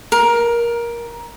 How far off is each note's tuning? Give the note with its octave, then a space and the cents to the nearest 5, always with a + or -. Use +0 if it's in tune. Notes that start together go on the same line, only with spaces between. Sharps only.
A#4 +15